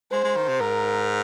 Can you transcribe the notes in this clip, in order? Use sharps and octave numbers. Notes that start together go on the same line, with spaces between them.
G#3 C5
G#3
D#3
C3
G#2 A#4